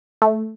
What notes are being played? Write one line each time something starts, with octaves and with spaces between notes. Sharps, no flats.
A3